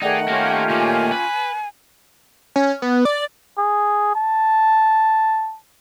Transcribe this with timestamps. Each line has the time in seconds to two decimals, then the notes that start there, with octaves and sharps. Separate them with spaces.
0.02 D#3 A3 D#4 G#4 D5 F#5 G5
0.28 A#3 C#4 F4 G4 A#4
0.69 A#2 A#3 G#5
1.12 B4
2.56 C#4
2.82 B3
3.05 D5
3.58 G#4
4.15 A5